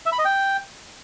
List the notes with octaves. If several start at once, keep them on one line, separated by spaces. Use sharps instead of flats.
E5
B5
D#5
G5